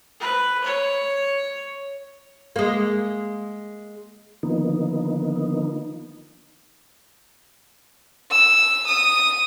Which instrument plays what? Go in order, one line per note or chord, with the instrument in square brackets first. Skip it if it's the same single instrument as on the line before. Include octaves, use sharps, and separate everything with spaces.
[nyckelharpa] B4
C#5
[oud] G#3 A#3
[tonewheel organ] D3 D#3 F3 A#3 B3 D#4
[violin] E6
D#6